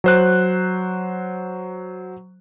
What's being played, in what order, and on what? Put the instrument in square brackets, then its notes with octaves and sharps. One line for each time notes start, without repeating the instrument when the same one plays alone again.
[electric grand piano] F#3 C5 F#6